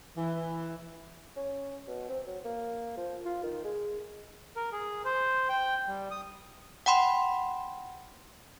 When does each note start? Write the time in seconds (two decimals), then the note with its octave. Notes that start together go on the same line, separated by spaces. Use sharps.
0.17 E3
1.37 C#4
1.88 B2
2.09 C4
2.27 F#3
2.45 A#3
2.97 F3
3.25 F4
3.43 D#3
3.65 G#3
4.56 A#4
4.72 G#4
5.05 C5
5.49 G5
5.88 G3
6.11 D#6
6.86 F#5 G5 B5 C6